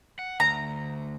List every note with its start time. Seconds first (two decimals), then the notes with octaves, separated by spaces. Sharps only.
0.19 F#5
0.40 D2 A#5